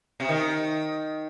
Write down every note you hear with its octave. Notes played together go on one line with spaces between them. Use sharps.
C3
D#3